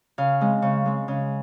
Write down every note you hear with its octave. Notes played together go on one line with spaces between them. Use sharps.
C#3 F5
G#3 C4
C#3
G#3 C4
C#3